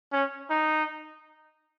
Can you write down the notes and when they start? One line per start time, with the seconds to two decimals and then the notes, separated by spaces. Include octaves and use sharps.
0.13 C#4
0.50 D#4